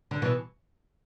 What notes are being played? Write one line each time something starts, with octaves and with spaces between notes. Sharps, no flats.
D3
B2 E3